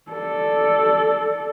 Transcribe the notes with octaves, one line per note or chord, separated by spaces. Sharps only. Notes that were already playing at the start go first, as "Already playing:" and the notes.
A4 D5